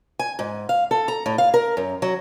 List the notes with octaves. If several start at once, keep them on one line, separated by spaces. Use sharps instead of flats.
G#5
G#2
F5
A4
A#5
A2
F5
A#4
F#2
F#3